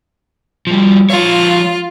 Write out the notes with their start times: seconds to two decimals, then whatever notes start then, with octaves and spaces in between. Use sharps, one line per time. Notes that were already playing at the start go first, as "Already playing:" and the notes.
0.67 F3 G3
1.10 F3 F4 C#5